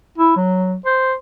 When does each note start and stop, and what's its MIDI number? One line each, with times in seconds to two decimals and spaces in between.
0.18 0.32 64
0.36 0.76 54
0.85 1.13 72